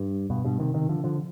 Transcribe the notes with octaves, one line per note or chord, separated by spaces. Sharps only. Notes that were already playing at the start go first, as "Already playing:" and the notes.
Already playing: G2
G2 B2
G2 B2
C3 D#3
C3 D#3
D3 F3
D3 F3